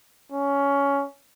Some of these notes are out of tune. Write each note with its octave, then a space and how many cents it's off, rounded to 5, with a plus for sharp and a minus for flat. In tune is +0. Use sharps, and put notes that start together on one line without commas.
C#4 +15